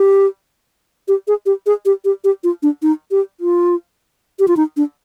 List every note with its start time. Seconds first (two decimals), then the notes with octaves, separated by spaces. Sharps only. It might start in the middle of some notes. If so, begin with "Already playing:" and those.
Already playing: G4
1.08 G4
1.28 G#4
1.46 G4
1.66 G#4
1.85 G4
2.05 G4
2.24 G4
2.44 F4
2.63 D4
2.82 D#4
3.11 G4
3.40 F4
4.39 G4
4.48 F4
4.57 D#4
4.77 D4